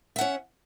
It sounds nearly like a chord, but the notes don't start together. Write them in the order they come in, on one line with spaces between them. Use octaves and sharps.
E5 F#5 C#4